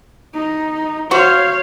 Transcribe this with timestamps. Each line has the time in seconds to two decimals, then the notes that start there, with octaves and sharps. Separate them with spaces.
0.34 D#4
1.11 F#4 C5 C#5 F5